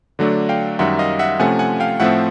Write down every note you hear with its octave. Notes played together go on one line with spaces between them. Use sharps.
D3 F#3 A3 D4
F5 G5
F#2 D#3 G3 E5 F#5
D#5 F5
E5 F#5
C3 F3 A3 C#4 F#5 G#5
F#5 G#5
F5 G5
A2 F3 A3 C4 E5 F#5